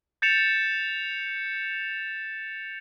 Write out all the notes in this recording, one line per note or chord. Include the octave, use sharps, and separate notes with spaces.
G6 A6 C#7 E7 F7